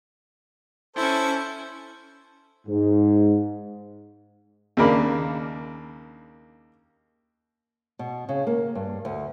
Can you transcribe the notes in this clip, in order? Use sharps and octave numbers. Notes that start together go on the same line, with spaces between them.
C#4 E4 A4 C5
G#2
D#2 C#3 A#3 D4 B5
B2
C#3
A#3
G2
D2